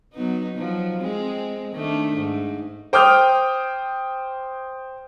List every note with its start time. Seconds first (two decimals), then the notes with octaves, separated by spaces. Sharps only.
0.13 F#3 B3 D#4
0.57 F3 F#3
1.00 G#3 C4
1.73 D#3 A3 D4
2.16 G#2
2.93 C5 G5 D6 D#6 F6 G6